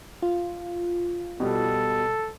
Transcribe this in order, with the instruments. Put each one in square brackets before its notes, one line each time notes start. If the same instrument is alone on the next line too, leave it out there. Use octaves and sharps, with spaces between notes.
[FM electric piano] F4
[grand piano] B2 G3 [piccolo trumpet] A4